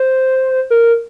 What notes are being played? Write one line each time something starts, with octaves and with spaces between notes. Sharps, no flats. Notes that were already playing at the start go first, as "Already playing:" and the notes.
Already playing: C5
A#4